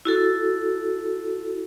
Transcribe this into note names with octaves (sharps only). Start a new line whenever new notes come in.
E4 F#4 A4